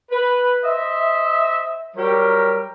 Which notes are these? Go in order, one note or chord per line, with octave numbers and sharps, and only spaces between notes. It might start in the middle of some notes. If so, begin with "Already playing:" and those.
B4
C5 D#5 E5
F#3 G3 G4 A#4